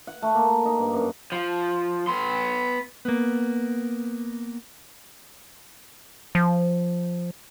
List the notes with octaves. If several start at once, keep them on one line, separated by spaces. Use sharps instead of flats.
F#5
A3
A#3
D#4
G2
F#2
F3
B3 C6
A#3 B3
F3